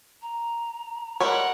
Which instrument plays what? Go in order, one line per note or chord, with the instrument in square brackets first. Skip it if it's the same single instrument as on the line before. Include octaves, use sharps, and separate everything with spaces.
[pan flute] A#5
[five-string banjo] G3 G#3 C#5 [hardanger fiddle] A#4 F#5 [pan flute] C6